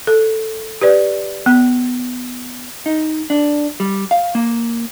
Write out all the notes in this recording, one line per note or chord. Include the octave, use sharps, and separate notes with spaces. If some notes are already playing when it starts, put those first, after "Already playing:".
A4
G4 B4 D5
B3
D#4
D4
G3
F5
A#3